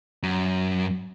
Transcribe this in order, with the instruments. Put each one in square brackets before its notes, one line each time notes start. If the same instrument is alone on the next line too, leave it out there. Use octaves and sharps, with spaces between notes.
[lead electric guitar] F#2